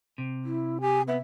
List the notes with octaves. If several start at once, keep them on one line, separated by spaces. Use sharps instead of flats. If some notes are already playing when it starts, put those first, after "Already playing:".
C3
E4
G4 G#5
B3 E5